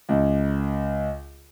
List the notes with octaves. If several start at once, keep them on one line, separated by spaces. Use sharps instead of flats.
C#2